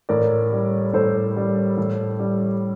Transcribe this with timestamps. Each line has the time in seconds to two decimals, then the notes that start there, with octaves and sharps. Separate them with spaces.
0.09 A2 A#4 D5
0.52 G3
0.93 A2 A4 C5
1.36 G3
1.77 A2
2.19 G3